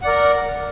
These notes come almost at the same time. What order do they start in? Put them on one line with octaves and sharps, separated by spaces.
F#5 D5 A#4 A#5